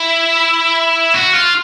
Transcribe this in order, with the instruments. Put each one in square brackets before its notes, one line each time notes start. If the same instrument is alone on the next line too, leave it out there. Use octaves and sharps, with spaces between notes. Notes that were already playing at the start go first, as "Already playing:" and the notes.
Already playing: [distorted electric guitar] E4
F#4
F4